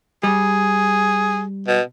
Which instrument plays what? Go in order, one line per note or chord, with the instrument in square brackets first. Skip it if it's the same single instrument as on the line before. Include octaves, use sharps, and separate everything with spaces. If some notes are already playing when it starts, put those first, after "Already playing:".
[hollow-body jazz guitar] G3 [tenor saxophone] G#4
[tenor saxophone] B2